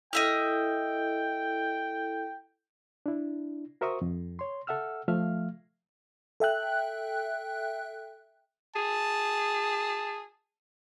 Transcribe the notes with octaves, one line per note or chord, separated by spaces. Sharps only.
E4 A4 D#5 E5 G5 F6
D4 E4
F#4 A#4 C5 E5 C#6 D#6
F2
C#5 C6
A4 E5 F#5 E6 F6
F3 A3 E5 F5 F6
A4 E5 G5 F#6
G#4 A5